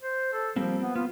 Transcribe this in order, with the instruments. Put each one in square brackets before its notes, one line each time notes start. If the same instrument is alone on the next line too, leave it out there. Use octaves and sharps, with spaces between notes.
[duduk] C5
A4
[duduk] F3 [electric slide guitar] G3 A#3 C4
[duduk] B3
[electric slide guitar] B3 [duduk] F4